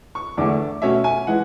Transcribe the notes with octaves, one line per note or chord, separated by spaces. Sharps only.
C#6
E2 D3 A3 D6
B2 A3 C#4 E5
G#5
E3 G#3 F#5